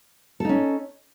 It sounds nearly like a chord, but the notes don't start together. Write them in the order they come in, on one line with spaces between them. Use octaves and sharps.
A4 D#4 C#4